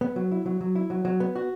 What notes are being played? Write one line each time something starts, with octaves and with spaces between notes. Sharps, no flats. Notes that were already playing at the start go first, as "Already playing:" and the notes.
B3
F#3
E4
F#3
F#3
E4
F#3
F#3
B3
F#4